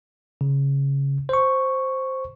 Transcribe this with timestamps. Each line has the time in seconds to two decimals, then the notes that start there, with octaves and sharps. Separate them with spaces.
0.41 C#3
1.29 C5 C#6